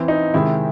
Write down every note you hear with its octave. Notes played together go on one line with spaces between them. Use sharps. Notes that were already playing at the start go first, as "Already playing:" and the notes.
Already playing: E3 C4
D#4
C3 D#3 G#3 C4 E4